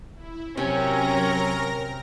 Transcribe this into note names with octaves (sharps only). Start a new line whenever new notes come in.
E4
C3 F#3 C#4 A#4 A#5 A#6